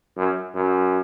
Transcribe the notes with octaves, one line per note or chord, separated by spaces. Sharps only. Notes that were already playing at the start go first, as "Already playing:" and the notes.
F#2
F#2